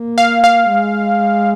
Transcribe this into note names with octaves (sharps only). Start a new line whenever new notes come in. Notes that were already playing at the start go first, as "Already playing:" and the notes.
Already playing: A#3
F5
F5
G#3